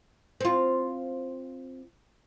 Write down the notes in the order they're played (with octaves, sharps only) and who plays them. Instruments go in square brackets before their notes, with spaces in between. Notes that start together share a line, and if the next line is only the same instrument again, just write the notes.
[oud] C4 F4